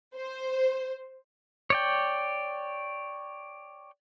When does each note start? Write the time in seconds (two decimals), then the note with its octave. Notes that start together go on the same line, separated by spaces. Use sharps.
0.15 C5
1.70 C#5 D5 G5